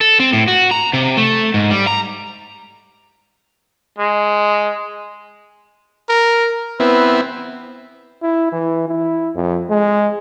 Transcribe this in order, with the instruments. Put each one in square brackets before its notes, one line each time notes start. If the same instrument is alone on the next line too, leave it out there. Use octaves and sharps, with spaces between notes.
[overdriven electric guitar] A4
C4
A2
F#4
A#5
C3
A3
G#2
G3
A#5
[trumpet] G#3
A#4
[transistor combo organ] B3 C4 E4 [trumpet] B4
[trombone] E4
E3
E4
F2
G#3